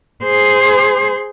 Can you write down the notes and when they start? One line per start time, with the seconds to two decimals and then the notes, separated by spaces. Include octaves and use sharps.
0.24 G#4 C5